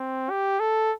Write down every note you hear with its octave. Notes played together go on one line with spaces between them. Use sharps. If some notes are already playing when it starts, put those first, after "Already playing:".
Already playing: C4
G4
A4